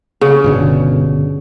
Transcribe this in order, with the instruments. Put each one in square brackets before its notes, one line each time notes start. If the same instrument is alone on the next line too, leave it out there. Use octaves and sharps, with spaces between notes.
[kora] C#3
[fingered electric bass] G1 B2 D3